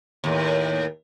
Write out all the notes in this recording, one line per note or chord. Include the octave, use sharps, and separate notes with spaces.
D#2 A2